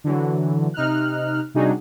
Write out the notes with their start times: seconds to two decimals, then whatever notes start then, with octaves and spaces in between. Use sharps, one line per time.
0.04 D3 E3 F#3
0.74 C3 D#4 F6 F#6
1.54 C3 G3 D4 D#4 F#4 G#4